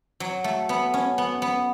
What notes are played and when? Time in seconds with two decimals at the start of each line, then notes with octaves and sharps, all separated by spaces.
0.20 F#3
0.44 A3
0.69 B3
0.94 C#4
1.18 B3
1.42 B3